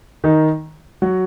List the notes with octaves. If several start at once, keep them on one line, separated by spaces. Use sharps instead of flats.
D#3 D#4
F#3 F#4